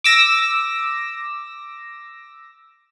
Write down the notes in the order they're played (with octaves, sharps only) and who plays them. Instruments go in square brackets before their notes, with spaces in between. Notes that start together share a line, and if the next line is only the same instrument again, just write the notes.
[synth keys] D6 E6 A#6